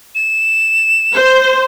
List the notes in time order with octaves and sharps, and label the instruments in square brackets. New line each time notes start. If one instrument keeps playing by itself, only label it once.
[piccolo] E7
[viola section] C5